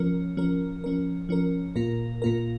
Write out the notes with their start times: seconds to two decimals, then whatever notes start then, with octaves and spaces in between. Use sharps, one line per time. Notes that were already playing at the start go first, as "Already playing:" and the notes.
Already playing: F3 C#4 A#4
0.37 F3 C#4 A#4
0.84 F3 C#4 A#4
1.29 F3 C#4 A#4
1.76 A#2 A#3 F4 A#4
2.22 A#2 A#3 F4 A#4